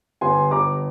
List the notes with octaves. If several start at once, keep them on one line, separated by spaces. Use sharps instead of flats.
G1 G#5 C6
G1 A#5 D6